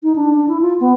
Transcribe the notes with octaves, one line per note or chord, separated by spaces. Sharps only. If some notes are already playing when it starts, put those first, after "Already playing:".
D#4
D4
D4
E4
F4
B3